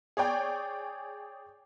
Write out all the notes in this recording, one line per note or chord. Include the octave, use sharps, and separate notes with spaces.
G#4 C#5 D5 G5